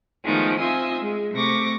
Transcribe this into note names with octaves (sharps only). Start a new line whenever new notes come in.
D#3 F3 G#3 A3 B3
C4 F4 D#5 E5 G#5
G#3
C3 A3 C#6 D6 A#6